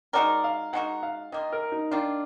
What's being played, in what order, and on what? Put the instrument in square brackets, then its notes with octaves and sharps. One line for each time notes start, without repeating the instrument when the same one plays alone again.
[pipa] G#3 D#4 F#4 A#4 [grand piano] D5
[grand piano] F5
[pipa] G#3 D#4 F#4 A#4 [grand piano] F#5
[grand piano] F5
[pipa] D#3 A#3 F4 [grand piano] D#5
[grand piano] A#4
D#4
[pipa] D#3 A#3 F4 [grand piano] D4